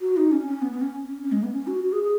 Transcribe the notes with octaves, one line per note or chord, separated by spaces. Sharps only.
F#4
D#4
C#4
C#4
B3
B3
C#4
C#4
C#4
G#3
B3
C#4
F#4
F#4
G#4
G#4